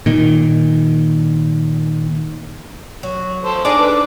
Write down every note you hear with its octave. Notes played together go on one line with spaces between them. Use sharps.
A#2 D#3
F#3
A4 C5
D4 D#4 G#4 D5 A5 D6
A4 B4